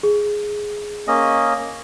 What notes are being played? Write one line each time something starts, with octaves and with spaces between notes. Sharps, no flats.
G#4
A#3 C#4 D#5